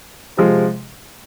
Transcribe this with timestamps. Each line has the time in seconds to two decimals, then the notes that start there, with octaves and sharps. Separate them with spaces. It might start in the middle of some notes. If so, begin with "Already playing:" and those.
0.37 C3 F3 G#3